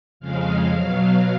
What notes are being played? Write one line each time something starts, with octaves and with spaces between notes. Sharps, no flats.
F2 C#3 F3 G#3 F5
B2 F#3